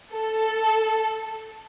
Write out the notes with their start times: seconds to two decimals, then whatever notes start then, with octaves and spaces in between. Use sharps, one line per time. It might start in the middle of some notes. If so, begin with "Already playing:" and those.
0.12 A4